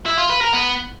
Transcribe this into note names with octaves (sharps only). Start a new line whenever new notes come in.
E4
F4
B4
A#4
B3